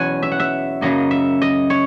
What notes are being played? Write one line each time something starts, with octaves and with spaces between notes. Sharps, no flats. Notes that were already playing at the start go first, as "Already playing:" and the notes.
Already playing: E2 B2 F#3 C#4 F#5 G#5
E5
F#5
E5
F#2 C#3 F#3 A#3 D#5
E5
D#5
C#5